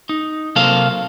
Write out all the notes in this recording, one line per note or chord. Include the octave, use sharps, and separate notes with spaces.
D#4
C3 F#3 A#3 A4 C5 F5